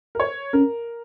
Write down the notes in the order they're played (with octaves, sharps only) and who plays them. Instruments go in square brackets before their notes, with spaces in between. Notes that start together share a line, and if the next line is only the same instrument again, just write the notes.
[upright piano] A#4
C#5
[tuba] C#4 [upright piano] A#4